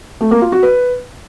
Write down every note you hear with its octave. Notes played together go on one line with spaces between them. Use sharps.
A3
A#3
F4
F#4
B4